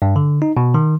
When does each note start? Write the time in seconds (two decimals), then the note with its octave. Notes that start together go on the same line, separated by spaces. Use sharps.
0.02 G2
0.16 D3
0.42 D#4
0.57 B2
0.74 D#3